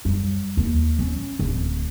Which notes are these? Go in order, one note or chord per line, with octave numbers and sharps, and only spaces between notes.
F#2 G3
D#2
C#4
D1